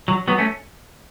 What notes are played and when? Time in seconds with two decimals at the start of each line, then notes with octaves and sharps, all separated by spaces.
0.08 F#3
0.28 F#3 B3
0.38 A3 C#4